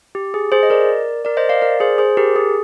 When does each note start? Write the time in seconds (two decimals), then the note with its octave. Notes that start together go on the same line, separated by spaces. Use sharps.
0.15 G4
0.34 G#4
0.52 G#4 C5
0.63 D#5
0.70 A#4 D5
1.25 A#4 D5
1.37 C5 D#5
1.49 D5 F5
1.62 A#4 D5
1.80 G#4 C5
1.98 G#4 C5
2.17 G4 A#4
2.36 G#4